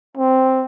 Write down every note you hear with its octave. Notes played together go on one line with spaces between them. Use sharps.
C4